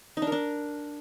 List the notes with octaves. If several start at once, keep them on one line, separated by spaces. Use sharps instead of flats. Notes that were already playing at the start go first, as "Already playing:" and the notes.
D#4
D4
A#4
D4